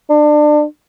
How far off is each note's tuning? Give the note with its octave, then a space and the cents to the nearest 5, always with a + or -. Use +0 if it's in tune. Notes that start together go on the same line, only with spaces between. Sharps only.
D4 +25